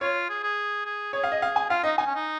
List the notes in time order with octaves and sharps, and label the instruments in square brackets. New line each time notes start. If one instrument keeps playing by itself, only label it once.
[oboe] F4 [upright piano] C#5
[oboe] G#4
G#4
G#4
[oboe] G#4 [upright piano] C#5
[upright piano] F5
D#5
F5
G#5
[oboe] F4 [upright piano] F5
[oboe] D#4 [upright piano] D#5
[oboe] D#4 [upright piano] G#5
[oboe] C#4
D#4